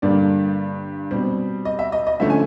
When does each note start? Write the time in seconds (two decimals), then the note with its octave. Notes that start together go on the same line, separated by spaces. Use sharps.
0.02 G2 D3 G3 A#3 D5
1.11 B2 G3 C4
1.65 D#5
1.79 E5
1.92 D#5
2.07 D#5
2.20 D3 F3 A3 C#4 E5
2.30 G#5